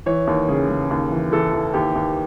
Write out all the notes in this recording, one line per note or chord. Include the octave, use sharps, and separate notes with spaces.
E3 C#5
D#2
C#3 G#4
C#3
D#2
E3
E3 A4
E3
D#2 G4
D#2